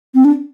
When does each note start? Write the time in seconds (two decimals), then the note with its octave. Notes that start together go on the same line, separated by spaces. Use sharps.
0.15 C4
0.25 D4